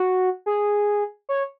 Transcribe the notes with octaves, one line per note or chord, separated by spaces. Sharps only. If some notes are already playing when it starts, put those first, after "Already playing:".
Already playing: F#4
G#4
C#5